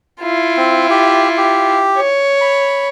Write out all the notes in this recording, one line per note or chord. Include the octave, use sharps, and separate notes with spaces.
E4 F4
C4
G4
G4
C#5
B5